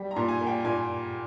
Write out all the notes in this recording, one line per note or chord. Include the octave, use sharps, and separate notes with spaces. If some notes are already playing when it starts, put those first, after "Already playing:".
Already playing: G3
A#5
A#2
G#5
A#3
G5
A#2 G#5